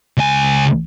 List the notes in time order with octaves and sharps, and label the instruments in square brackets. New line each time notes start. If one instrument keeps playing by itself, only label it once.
[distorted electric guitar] C#2 G#5